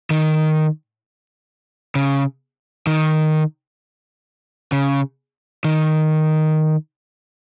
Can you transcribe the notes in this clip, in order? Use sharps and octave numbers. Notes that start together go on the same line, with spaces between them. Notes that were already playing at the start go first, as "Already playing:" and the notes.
D#3
C#3
D#3
C#3
D#3